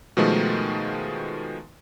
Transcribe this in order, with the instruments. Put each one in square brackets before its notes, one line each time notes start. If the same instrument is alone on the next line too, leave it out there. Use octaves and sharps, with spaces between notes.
[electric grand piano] B2 D#3 F3 G#3 A3